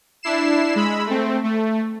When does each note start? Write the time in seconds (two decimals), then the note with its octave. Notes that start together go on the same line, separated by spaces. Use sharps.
0.23 D4 E4 C7 E7
0.76 G#3 B5 E6
1.07 A3 C4
1.44 A3